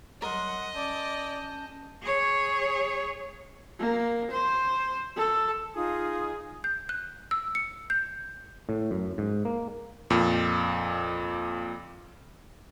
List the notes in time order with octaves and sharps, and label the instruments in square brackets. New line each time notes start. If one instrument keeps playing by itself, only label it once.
[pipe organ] F#3 G3 [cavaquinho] A#4 C6 [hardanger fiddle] D#5 [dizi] F#5
[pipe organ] C#4 A5 G6 [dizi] D5
[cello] G#4 C#5
[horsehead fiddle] A#3
C5
A4
[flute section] D#4 F4 D#6 [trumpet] G#4
[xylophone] G6
F#6
E6
C#7
G6
[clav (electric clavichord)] A2
F#2
G#2
A#3
[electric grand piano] F2 A#2